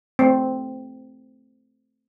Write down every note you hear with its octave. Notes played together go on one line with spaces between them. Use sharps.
A3 C4